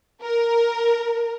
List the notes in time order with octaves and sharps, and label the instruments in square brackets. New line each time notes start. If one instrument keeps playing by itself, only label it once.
[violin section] A#4